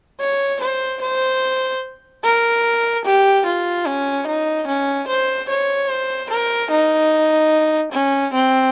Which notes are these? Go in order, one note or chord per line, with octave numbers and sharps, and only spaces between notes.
C#5
C5
C5
A#4
G4
F4
C#4
D#4
C#4
C5
C#5
C5
A#4
D#4
C#4
C4